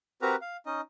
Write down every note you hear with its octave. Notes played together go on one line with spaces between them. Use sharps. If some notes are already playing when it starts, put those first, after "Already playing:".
C4 F#4 G4 A#4 B4 A#5
F5
C#4 D#4 D#5